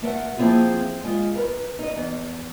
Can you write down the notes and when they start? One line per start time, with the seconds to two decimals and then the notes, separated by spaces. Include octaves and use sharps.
0.02 A3 A#4 F#5
0.37 F3 A#3 C4 E4 F4 G#4
1.03 G#3 F4
1.35 A#4 B4
1.79 D#4 D#5
1.96 E2